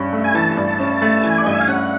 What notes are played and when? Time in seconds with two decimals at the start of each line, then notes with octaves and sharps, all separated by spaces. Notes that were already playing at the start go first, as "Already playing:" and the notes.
Already playing: G2 C#4
0.13 A3
0.24 G#5
0.34 E3 A5
0.57 G2
0.80 C#4
1.02 A3
1.23 E3 G#5
1.38 D5
1.46 G2 D#5
1.53 E5
1.61 F5
1.68 C#4 F#5